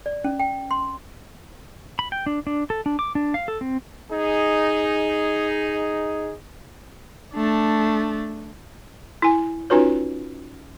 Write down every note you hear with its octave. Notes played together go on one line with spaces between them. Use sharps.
D5
C#4
G5
C6
B5
G5
D4
D4
A4
D4
D6
D4
F5
A4
C4
D#4 G#4
A3 D4
E4 G#5
C#4 D#4 F4 F#4 B4 C#5